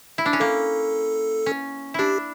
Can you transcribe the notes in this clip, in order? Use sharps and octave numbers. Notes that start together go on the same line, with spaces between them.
E4
D4
C#4
A#3 A4
C#4
D4 E4 G4